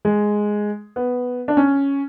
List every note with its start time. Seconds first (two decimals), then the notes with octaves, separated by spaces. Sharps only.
0.05 G#3
0.96 B3
1.48 D4
1.57 C#4